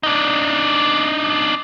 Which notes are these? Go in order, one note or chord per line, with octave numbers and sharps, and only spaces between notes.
D4 D#4